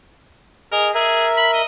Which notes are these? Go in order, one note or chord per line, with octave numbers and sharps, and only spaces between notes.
G#4 A#4 D#5
G#4 A#4 E5
B5
D#5